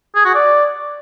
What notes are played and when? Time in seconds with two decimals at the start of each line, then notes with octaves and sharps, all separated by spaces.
0.15 G#4
0.25 F#4
0.35 D5